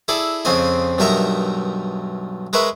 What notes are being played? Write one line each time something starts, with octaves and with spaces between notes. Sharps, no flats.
E4 G#4 A4 D5
F2 C#3 C4 D#5 G#5
B1 G2 D#4 A#4 E5 A#5
G#3 A#4 B4 C#5 E5